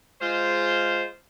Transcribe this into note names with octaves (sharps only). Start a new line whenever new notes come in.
G#3 F4 C5